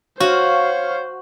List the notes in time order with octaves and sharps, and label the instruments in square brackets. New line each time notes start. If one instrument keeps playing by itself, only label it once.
[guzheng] F#4 [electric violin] C5 [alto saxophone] C#5 [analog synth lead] F5